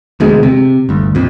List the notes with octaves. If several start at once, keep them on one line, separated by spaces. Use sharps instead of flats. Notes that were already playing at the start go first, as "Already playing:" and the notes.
E1 D2 B2 G#3
C3
G1 D2
A#1 F2